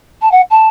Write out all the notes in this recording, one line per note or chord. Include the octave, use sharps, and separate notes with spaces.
A5
F#5
A5